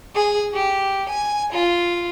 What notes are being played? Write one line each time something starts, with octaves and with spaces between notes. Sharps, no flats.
G#4
G4
G#5
F4